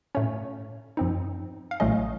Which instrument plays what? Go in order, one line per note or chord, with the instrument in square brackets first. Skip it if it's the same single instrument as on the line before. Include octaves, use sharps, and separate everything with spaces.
[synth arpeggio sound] A2 A3 C#4 C#5
F#2 F3 C4 D#4
F5
A1 A2 F#3 A3 C#4 D#5